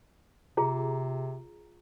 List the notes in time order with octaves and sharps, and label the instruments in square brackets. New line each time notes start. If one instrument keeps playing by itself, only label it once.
[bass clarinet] C3 [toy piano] F4 G#4 A#5